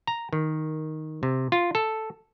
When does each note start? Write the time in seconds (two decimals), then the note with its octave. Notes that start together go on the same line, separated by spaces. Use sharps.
0.07 A#5
0.33 D#3
1.23 C3
1.52 F4
1.75 A4